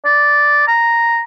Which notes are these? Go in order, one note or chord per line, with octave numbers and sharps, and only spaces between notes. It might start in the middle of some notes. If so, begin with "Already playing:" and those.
D5
A#5